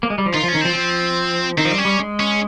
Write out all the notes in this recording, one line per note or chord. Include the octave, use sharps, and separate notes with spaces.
A#3
G#3
G3
F3
D#3 F4
F3 C#4
D#3
F3 C4
F3
D#3 C4
F3
G3
C#4
G3
G#3
C#4